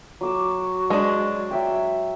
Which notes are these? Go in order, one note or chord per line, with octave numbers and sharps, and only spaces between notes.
F#3 F#4 D6 E6
G#3 D4
F#3 E5 G5